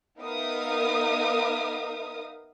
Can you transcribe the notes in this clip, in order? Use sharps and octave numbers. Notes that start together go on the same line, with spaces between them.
B3 D#4 A#4 E5 F5 D#6